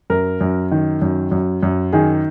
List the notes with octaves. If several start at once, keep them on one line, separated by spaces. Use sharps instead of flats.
F#2 A#4
F#2
D#3
F#2
F#2
F#2
D#3 G#4